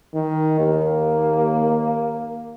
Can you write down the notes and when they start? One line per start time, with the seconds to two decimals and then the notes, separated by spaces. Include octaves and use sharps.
0.15 D#3
0.59 D#2 A#3